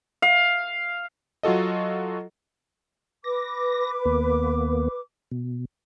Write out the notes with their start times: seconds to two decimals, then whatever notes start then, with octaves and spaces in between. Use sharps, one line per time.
0.22 F5
1.43 F#3 F4 F#4 A4 D#5
3.24 B4 D6 A#6
4.05 D#2 A#3 B3
5.32 B2